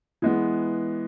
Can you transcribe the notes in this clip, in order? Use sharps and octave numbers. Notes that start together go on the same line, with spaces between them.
E3 G#3 B3